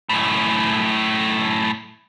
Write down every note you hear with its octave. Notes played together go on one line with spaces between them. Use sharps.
F#2 A2